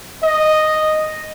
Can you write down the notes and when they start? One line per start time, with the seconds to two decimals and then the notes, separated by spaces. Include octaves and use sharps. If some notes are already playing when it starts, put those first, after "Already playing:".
0.23 D#5